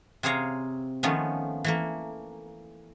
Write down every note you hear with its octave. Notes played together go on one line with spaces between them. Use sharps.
C3 C4 G#4 C#5 F5 A#5
D#3 F3 A3 B3 C#4
E3 A3 A#3